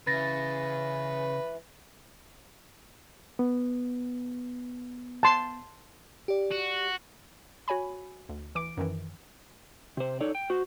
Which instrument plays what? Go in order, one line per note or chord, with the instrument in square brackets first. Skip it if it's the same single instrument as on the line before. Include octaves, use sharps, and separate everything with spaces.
[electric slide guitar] C#3 [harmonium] E3 [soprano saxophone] B4 [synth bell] A6 A#6
[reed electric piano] B3
[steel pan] A5 C6
[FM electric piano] G4 D5
[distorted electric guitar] F#4
[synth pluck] F#4 C#5 G#5 B5
D2
E3 D6 D7
F#2 D#3 E3
[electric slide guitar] C3 C5
D#4 A4 C#5 D5
G5
F#4 C5